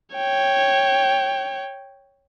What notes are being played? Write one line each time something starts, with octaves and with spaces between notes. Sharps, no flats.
C#5 G5